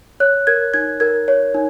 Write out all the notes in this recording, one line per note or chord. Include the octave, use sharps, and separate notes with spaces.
C#5 F#6
A#4 G#6
D#4 G#6
A#4 G#6
C#5
D#4